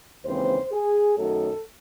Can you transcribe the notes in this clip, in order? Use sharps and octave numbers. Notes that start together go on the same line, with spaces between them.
D#2 C#3 E3 G#3 C4 C5
G#4
F#2 D#3 F#3 A3 A4